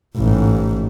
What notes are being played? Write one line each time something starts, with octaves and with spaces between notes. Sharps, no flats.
A1 G#2